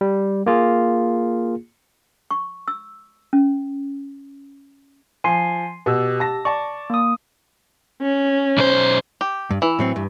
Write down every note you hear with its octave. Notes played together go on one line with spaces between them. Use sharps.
G3
A#3 F4 G#4
C#6
E6
C#4
F3 G#5 C6 C7
B2 G4 E6
A5 A#6
D5 A5 C#6
A#3 D#6
C#4
B1 C5
G4
G2
E3 E4
A2 F#3 C4
G2